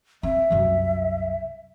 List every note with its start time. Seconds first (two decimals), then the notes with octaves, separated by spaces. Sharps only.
0.23 C4 E5
0.51 C2 F#2